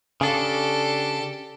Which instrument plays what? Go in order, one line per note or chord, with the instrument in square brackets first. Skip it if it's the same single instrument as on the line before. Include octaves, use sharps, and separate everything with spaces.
[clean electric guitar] C#3 D4 [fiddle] G4 A4